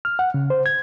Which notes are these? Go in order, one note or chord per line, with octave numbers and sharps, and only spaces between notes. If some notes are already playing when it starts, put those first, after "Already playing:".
F6
F#5
C#3
C5
G#6